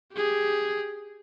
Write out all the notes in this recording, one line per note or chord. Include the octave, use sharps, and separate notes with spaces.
G4 G#4